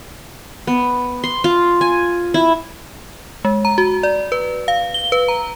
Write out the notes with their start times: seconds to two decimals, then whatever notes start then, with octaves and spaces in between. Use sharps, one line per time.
0.67 B3
1.24 C6
1.44 F4
1.81 G#5
2.34 E4
3.45 G#3
3.65 A#5
3.78 F#4
4.03 D5
4.32 B4
4.68 F5
4.94 G7
5.12 B4
5.28 A#5